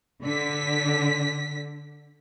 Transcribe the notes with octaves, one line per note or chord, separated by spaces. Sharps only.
D3 B6